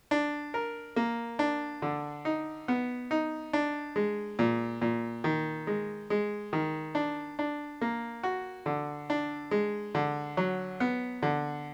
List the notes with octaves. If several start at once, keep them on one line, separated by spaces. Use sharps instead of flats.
D4
A#4
A#3
D4
D3
D#4
B3
D#4
D4
G#3
A#2
A#2
D#3
G#3
G#3
D#3
D4
D4
A#3
F#4
D3
D4
G#3
D3
F#3
B3
D3